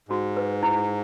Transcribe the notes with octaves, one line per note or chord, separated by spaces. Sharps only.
G#2 F#4
B4
E4